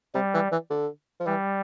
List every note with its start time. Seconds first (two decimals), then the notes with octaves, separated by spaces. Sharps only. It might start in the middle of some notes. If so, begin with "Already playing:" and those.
0.14 C3 G3
0.34 E3
0.52 E3
0.70 D3
1.20 F3
1.26 E3 G3